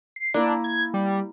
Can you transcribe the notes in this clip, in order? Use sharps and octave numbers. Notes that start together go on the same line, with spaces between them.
C7
A#3 D4 E4
G#6
G3